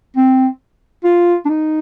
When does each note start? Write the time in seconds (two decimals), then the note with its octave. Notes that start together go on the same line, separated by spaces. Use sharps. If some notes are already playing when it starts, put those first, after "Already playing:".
0.16 C4
1.04 F4
1.45 D4
1.49 D#4